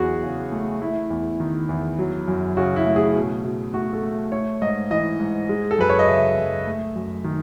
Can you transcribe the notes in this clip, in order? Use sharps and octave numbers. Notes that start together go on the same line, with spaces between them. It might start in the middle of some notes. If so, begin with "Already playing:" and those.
Already playing: E2 F#3 F#4 G#4
C#3
A3
A3 E4
E2
D#3
E2
F#3
F#2
C#3 F#4
E4
A3
G#4
B2
B2
A3 F#4
A4
A3
A3 C#5
G#2 D#5
E3 D#5
G#2
G#3
A4
F#2 B4
C#5
D#5
C#3 E5
F#2
A3
F#2
D#3